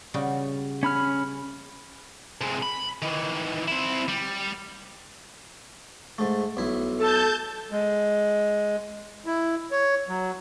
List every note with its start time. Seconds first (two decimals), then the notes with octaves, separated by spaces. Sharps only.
0.14 C#3 G3 F#4
0.83 C#4 B5 F6
2.41 C3 G#3
2.63 B5
3.02 D#3 E3
3.68 C4 E4
4.08 G3
6.18 G#2 A3
6.57 B1 E4
6.99 A4 A5 G6
7.71 G#3
9.26 E4
9.71 C#5
10.09 F#3